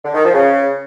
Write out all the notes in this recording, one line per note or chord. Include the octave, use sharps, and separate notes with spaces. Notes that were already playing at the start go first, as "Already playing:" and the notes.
D3
D#3
F3
C#3